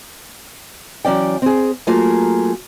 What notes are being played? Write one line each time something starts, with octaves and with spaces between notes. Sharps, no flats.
E3 F#3 C#4 D5 G5
C4 G#4
F#3 A3 A#3 F4 G#4